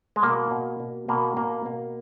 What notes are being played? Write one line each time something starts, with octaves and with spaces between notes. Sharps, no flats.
G#3
B2 A#3
B2
B2
B2 A#3
B2 A#3
B2 A#3